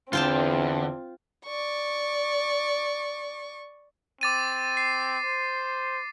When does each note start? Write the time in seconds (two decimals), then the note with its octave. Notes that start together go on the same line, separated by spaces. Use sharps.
0.13 E2 D3 C4 F4 G5 A5
1.46 D5 C#6
4.21 C4 D6 A6 D#7
4.77 C7
5.24 C5